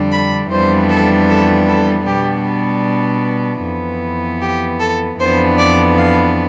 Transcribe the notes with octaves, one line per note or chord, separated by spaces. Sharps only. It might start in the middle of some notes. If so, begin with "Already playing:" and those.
Already playing: F2 D3 G3 D4
B5
F2 E3 G3 B3 D4 C5
A4
A4
A4
B2 G3 B3 D4 G4
F2 E3 B3
G4
A4
F2 E3 B3 D4 C5
D5
F5